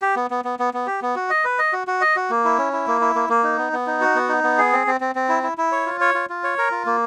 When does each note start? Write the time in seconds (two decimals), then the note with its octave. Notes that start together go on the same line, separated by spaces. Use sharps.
0.02 G4
0.16 B3
0.31 B3
0.45 B3
0.59 B3
0.74 B3
0.87 G4
1.02 B3
1.16 F#4
1.30 D#5
1.45 B4
1.59 D#5
1.73 F#4
1.87 F#4
2.01 D#5
2.16 F#4
2.30 A#3
2.44 E4
2.58 C#4
2.73 E4
2.87 A#3
3.01 E4
3.15 A#3
3.29 A#3
3.43 D#4
3.58 B3
3.73 B3
3.87 D#4
4.01 F#4
4.15 B3
4.29 D#4
4.44 B3
4.58 G#4
4.72 C4
4.87 C4
5.01 C4
5.15 C4
5.29 E4
5.43 E4
5.58 E4
5.72 C#5
5.86 F4
6.01 C#5
6.14 F4
6.30 F4
6.44 C#5
6.58 A#4
6.72 F4
6.86 A#3